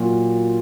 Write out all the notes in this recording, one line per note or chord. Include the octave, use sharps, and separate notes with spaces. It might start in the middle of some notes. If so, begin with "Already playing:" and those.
Already playing: A#2 F#3